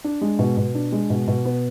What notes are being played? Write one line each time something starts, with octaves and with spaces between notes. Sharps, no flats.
D4
G#3
B2
B2
D4
G#3
B2
B2
B3